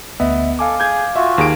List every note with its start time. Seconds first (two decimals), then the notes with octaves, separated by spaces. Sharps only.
0.20 D2 B3 D#5 E5
0.59 A4 F5 G#5 D6
0.80 G#4 G6 G#6
1.16 F4 F#4 E5
1.38 D#2 G#4 D7